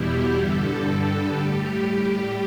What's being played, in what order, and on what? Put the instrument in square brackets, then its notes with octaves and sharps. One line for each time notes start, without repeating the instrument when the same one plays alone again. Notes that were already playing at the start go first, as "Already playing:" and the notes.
Already playing: [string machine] E2 B2 G3 E4 G4
G2 D3 G3 A4
A2 G3 G4